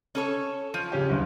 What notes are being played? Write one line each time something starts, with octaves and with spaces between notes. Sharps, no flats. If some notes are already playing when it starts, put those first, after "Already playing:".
C#4 A4 C#5
F3 D#7
C#3 C#4 G4
G1 C2